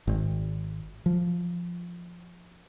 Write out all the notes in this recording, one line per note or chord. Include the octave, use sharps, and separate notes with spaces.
G#1
F3